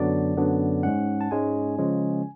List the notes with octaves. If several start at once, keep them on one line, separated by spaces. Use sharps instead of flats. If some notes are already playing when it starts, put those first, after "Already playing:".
Already playing: F#2 D3 F#3 B3 D4 D5
F#2 D3 F#3 B3 D4
G#2 G#3 C#4 F#5
A5
G#2 G#3 C#4 G#5
C#3 F3 G#3 C#4